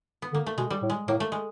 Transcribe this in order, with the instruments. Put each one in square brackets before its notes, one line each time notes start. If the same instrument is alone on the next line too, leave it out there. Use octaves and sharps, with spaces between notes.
[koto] B3
[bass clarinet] D3 [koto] A#3
[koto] A3
[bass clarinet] B2 [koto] G#3
[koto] G3
[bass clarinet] A2
[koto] G#3
[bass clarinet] A2 [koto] A#3
[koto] A3
G#3